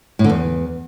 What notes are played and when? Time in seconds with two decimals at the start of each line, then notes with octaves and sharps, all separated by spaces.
0.19 A2
0.24 D3
0.30 E2